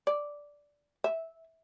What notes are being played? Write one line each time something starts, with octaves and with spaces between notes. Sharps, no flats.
D5
E5